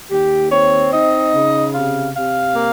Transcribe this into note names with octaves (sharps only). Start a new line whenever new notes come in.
D#2 G4
C4 C#5
D#4 D#5
C#3
C3 F5
C3 F5
A#3